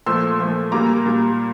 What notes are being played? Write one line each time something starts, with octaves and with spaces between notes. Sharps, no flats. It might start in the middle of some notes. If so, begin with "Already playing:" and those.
A#2 F3 A3 C6 E6
A#2 F3 A3
A#2 G3 A#3 A#5 D6
A#2 G3 A#3